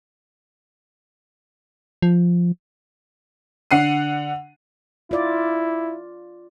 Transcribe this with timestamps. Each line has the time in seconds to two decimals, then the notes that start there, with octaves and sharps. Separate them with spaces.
2.02 F3
3.71 D3 F#5 C7 D#7
5.11 E4 F4 D5